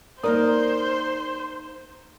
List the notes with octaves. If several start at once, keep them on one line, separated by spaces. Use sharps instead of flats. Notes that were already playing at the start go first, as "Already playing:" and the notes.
A#3 D#4 A#4 C5 D5 D#6